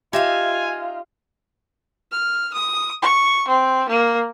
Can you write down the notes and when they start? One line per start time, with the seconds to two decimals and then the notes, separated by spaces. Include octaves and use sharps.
0.13 D#4 F4 G4 E5 F5 G#5
2.12 F6
2.54 D#6
3.02 C#6
3.48 C4
3.89 A#3